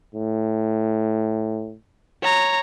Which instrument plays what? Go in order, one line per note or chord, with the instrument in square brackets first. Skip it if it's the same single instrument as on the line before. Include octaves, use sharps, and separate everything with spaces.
[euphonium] A2
[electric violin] C#5 A#5